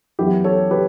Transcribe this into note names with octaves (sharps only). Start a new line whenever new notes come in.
F#2 E3 B3 E4 G4
A4 C#5
G4 B4